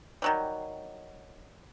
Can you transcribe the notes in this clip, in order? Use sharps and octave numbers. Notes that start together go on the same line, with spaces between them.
D#3 F#3 G3